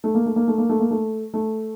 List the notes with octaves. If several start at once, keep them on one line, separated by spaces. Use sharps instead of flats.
A3
A#3
A3
A#3
A3
A#3
A3
A#3
A3
A3